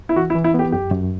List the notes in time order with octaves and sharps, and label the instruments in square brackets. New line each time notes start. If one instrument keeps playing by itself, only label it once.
[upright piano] E4
[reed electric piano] E3 [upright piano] F#4
[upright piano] E4
[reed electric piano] E3
[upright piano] E4
[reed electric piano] B3 [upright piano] G4
[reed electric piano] F#2 [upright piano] G4
[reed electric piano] F#2